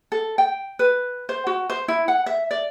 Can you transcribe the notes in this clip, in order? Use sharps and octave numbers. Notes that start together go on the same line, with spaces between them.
A4
G5
B4
C5
F#4
C5
E4
F#5
E5
D5